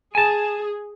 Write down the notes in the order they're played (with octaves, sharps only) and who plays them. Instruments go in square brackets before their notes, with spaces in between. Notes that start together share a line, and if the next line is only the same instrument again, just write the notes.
[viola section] G#4 [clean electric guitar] G#5 A5